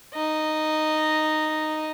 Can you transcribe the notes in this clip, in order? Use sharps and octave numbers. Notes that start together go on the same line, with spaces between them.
D#4 D#5